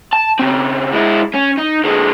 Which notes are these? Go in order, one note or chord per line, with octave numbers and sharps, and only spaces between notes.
A5
C#3 C4
G#3 E4
C#4
D#4
D3 G#3